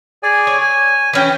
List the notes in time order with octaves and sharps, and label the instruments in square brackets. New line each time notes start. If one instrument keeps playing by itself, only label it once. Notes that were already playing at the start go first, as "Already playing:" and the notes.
[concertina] G#4 D5 G#5
[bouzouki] C#5
[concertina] G#5
[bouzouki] E3 C#4 G5